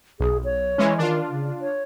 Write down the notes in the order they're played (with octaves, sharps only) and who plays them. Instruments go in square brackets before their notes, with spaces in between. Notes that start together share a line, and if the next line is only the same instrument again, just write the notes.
[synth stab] B1 [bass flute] G#4
[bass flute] C#5
[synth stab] E3 G#3 C#4
[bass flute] D#3 [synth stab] D4 F4
[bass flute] C#3
C#5